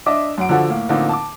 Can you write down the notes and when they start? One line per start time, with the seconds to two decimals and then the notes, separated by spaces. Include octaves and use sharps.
0.06 D4 D#5 E5 D6
0.38 F#2 F#5 D7
0.49 D3 F3 F#4 A4
0.70 A2 A#3
0.89 A2 D3 F3 A#3 C4 D#4
1.09 A5 D6